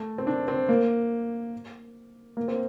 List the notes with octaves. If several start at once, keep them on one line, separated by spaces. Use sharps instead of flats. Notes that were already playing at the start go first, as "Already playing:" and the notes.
Already playing: A3
C4
D4
C4
A#3
A#3
C4